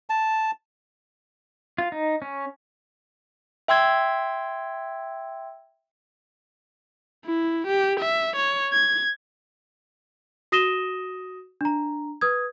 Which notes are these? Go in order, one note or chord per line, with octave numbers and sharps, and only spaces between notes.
A5
F4
D#4
C#4
E5 G5 C6 E6 G#6
E4
G4
E5
C#5
G#6
F#4 D#6 A#6 D#7 E7 G7
D4 A#5
B4 D#6 G#6